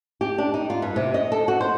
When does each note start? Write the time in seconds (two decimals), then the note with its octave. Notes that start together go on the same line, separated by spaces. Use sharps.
0.21 G4
0.38 D4
0.54 D#4
0.70 F4
0.82 G2
0.96 C3
1.14 D#5
1.32 A4
1.48 F#4
1.61 C5